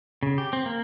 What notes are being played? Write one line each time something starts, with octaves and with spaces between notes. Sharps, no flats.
C#3
G4
C4
A#3